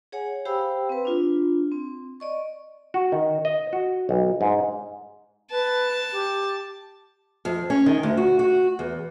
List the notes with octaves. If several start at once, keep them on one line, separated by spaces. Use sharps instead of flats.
G#4 C#5 F#5 G#5
G4 C5 F5 G5 B5 E6
C4 B4
D4 F4
C4
D5 D#5 C#6
F#4
D#3
D#5
F#4
B1
G#2
B4 A5
G4
F2
C#4
D#3
D2
F#4
F#4
E2